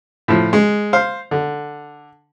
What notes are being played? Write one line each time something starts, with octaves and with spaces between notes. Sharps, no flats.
A2 F3
G#3
C5 F5
D3